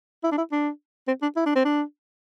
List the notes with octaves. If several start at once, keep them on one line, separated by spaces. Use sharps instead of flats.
E4
D4
E4
D4
C4
D4
E4
D4
C4
D4